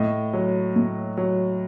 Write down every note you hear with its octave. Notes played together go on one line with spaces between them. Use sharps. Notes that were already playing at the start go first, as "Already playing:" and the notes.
Already playing: A2 D#5
F#3
A2
F#3